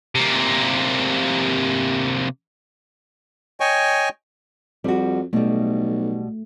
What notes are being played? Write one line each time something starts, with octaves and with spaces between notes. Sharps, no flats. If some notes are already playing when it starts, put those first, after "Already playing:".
C3 A#3
C#5 D#5 G5 G#5 C#6
F2 G3 F#4
B1 B2 G3 A3